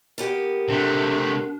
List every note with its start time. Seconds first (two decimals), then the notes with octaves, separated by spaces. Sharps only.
0.18 A#3 B3 G4
0.69 C3 A3 D4